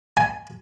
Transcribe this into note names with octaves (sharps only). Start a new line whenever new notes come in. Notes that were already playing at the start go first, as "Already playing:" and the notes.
G#5